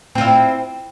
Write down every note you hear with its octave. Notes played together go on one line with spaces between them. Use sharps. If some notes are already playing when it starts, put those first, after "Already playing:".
C4 E4 F4